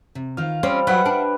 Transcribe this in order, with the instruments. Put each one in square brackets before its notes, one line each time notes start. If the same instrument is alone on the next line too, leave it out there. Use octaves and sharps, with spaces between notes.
[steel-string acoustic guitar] C3
[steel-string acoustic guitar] D#3 F4 [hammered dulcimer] F5
[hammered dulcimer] G3 [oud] C4 [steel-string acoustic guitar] C#4
[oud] F#3 [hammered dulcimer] B4 [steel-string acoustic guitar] E5 F#5
[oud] D4